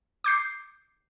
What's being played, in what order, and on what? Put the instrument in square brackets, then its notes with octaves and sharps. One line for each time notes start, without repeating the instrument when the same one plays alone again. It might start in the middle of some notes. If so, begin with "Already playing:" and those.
[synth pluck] D6 G6 C7